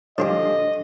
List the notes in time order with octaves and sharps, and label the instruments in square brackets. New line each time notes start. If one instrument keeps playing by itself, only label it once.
[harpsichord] F3 F4 G4 [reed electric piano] D4 A4 [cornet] D#5